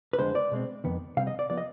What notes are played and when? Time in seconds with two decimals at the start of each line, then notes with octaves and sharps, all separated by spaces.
0.13 B4
0.19 F2 D3 G#3 C5
0.35 D5
0.52 B2 G#3 C4
0.84 F2 D#3 B3
1.17 C3 G3 C4 F5
1.27 D#5
1.39 D5
1.50 F3 B3 D5
1.57 D#5